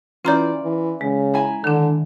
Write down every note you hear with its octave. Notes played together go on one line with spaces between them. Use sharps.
E3 C#4 F4 D5 A#5 G6
E3
C#3 G#3
E4 G#5 A#5
D3 D#3 D4